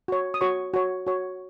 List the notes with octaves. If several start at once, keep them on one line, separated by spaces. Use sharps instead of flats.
F#4 C#5
D#6
F#4 C#5 C#6
F#4 C#5
F#4 C#5